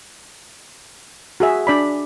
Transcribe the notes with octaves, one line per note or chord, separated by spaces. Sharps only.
F#4 G#4 E5
D4 D5 B5